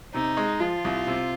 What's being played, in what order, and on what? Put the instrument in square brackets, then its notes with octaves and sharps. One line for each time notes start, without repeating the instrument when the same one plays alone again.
[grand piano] C3 [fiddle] D#4
[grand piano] G#3
[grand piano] F3 [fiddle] F4
[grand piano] C2
C3